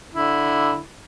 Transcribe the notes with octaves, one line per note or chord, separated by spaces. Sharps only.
D3 E4